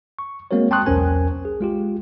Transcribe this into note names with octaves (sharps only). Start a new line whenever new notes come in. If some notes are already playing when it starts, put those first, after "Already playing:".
C#6
G#3 A#3 C4 F#4 A#4 C#5
G5 A5 C6 C#6 D#6 F#6
B1 E2 C#4 A#4 C5 G#5
G#4
G#3 F4 G4